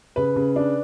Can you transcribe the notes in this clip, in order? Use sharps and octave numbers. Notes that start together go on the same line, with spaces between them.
C#3 B4
C#3
D4